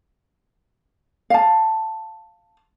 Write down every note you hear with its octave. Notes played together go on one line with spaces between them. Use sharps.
F5 A5